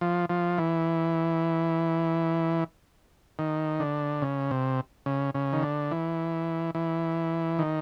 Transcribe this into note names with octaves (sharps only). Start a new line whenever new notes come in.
F3
F3
E3
D#3
D3
C#3
C3
C#3
C#3
D#3
D3
E3
E3
D#3